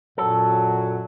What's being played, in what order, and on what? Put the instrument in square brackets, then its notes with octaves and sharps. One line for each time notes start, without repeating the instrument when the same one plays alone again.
[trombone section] F#2 F#3 [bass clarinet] A#2 [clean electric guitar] A4